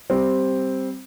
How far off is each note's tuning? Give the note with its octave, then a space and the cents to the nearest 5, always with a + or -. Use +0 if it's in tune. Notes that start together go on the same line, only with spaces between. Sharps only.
G3 +0 C4 +0